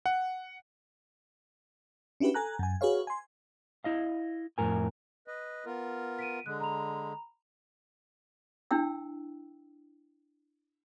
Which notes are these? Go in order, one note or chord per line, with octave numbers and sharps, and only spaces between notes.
F#5
C#4 D4 E4 F#4 G4 B4
A4 G#5 A#5 F#6
F#2 G#5
F#4 G#4 B4 C#5 F5
G#5 C6
E4 D#5 F5
F2 A2 A#4 G#5
B4 D#5
B3 F4 A#4
B6 D7 D#7
D3 G#3 F#6
A#5 B5 F7
D4 E4 G5 E6